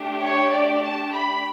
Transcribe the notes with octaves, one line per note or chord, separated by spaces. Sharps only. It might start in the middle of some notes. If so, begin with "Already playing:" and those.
Already playing: A3 D4 G4
C#5
D5
A5
B5